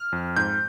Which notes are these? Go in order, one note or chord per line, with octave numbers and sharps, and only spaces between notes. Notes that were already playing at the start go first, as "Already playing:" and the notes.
Already playing: F6
F2
G#2 G6